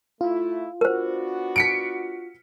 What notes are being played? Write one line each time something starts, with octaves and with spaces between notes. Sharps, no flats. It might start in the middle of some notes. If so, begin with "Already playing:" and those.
A3 E4 F4
B3 D4 F#4 A#4 C5
B6 C#7 D7